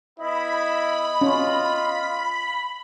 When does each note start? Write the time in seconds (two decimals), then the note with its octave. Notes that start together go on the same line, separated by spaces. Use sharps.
0.18 B3 E4 D#5 B5
1.21 C#4 F4